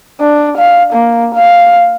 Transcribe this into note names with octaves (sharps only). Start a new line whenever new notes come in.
D4
F5
A#3
F5